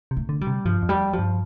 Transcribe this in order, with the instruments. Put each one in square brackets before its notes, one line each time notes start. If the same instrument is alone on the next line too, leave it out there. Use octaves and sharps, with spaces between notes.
[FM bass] C3
[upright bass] A3
[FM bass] D3
[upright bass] G3
[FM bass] C3
[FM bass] G2 [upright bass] F3
[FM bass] F2
[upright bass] G3
F3
[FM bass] G2